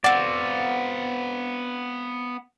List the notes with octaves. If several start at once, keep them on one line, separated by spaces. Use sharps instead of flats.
B3 C4 F#4 D5 F5